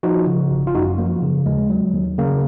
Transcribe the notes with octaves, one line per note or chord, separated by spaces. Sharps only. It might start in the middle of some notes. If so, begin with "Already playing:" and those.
F3 D#4 F#4
C#3
G#1
F4
F#2 D#4 F#4
F3 A#3
C#3
D#2 G#3
F#3
D#2
C#3 A#3